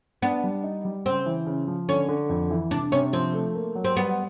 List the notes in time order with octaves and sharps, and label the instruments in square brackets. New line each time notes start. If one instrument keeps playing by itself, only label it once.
[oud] B3 [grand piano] D4
[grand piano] G3
D#4
G3
[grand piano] C#3 [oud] C4
[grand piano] E3
C#3
F3
[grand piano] D3 [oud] C#4
[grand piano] D3
F2
E3
[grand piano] C3 [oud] D4
[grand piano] C3 [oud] C#4
[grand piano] F3 [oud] C4
[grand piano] A3
A#3
F#3
[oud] C4
[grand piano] G3 [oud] B3